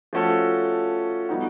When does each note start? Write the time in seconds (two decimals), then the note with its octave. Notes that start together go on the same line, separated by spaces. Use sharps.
0.13 F3 A3 C#4 F#4 A4
1.29 G3 B3 D#4 F#4